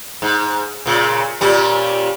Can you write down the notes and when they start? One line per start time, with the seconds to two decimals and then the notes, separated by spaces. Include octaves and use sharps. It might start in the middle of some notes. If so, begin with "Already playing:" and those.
0.22 G#2
0.86 A#2 C#3
1.41 A#2 G3 C#4